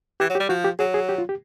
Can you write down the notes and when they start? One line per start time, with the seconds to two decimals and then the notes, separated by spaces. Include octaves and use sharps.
0.20 E3 G4
0.30 F#3
0.35 G4
0.39 G3
0.49 F3 F#4
0.64 G4
0.79 F#3 G#4
0.94 G#4
1.09 G4
1.18 F4
1.29 G4